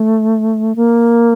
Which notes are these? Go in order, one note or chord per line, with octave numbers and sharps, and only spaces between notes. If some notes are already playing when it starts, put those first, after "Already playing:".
Already playing: A3
A#3